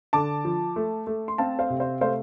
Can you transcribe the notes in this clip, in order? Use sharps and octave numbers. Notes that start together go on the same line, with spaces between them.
D3 A5 D6
F3
A3
A3
C6
C4 F5 A5
C5 F5
C3
C5 F5
A3 C5 F5